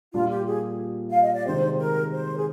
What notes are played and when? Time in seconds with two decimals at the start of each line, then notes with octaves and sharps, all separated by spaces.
0.13 A#2 G3 D4 F4
0.30 G4
0.47 G#4
1.10 F5
1.22 D#5
1.34 D5
1.46 C3 D#3 G#3 C4 G4 C5
1.79 A#4
2.12 C5
2.37 G#4